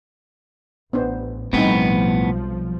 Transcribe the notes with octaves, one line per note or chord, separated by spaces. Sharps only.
A1 B3 D4 C5
B1 A2 F3 G3 B3 C4 D#4